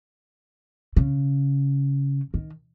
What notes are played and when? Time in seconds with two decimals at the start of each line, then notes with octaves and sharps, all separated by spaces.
0.96 C#3
2.34 D#3